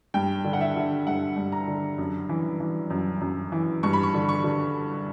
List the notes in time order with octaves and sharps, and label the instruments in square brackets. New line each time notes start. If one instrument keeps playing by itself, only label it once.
[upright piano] G2 G5
D3
F#5
E5
D3
G2 F#5
G2
A#5
D3
F#2
E3
E3
F#2
F#2
E3
G2 C#6
B5
C#6
D3
C#6
D3